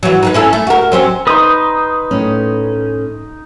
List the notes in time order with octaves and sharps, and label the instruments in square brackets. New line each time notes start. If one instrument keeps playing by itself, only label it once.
[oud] E3 F#3
D#4 F#4 B4
C#4 E4 A4
A3
F#4 A#4
F#3 C4 C#4
[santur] D#4 C6 [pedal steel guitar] B4 D#6
[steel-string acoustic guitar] A2 C#4